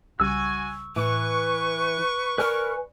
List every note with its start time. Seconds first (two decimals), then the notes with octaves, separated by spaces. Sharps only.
0.20 C2 C#3 G3 F#4 G#5 C#6 E6
0.96 A2 E3 B4 B5 C#6
2.38 A#4 B4 D5 G#5 F6